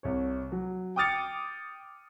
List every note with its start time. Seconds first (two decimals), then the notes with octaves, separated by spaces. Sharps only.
0.03 C2 C#5
0.52 F#3
0.96 G5 D6 D#6 F6 A6 C#7